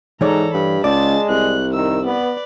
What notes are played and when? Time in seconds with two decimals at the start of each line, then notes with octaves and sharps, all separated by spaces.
0.21 G#2 E3 A4 C#5 D5 A#5
0.54 G2 B5
0.84 C#2 G#3 D5 A5 A6
1.29 C2 F#6
1.73 D#3 E6
2.05 B3 B4 D5